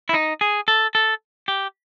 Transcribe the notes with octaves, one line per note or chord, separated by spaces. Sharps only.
E4
D#4
G#4
A4
A4
G4